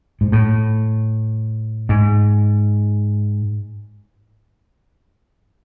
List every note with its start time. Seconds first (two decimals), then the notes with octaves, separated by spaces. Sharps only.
0.21 G#2
0.32 A2
1.89 G#2